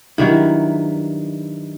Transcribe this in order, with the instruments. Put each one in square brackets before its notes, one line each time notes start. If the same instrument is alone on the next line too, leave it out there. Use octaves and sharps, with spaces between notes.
[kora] G2 D#3 F#3 [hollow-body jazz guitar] E4